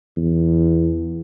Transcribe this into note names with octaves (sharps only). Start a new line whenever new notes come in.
E2